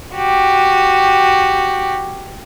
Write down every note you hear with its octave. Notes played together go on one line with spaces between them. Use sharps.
F#4 G4